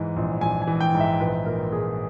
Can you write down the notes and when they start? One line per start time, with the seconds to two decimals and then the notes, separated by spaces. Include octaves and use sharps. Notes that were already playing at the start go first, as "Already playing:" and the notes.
Already playing: G#2 E3
0.16 A#1
0.41 A#1 G#5
0.62 G#5
0.67 E3
0.81 G5
0.95 G#2
1.00 E5
1.19 A#1 B4
1.45 A#2 A#4
1.72 A#2 G#4